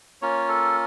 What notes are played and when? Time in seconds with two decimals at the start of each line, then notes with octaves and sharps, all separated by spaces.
0.22 A#3 C#4 F4 C#5
0.49 A4